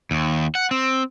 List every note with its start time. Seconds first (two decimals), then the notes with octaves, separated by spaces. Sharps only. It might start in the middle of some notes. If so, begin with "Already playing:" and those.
0.11 D#2
0.55 F#5
0.71 C4